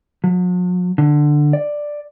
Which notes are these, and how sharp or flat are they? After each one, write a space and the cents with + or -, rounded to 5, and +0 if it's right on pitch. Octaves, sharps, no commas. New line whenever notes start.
F#3 -45
D3 +10
D5 +5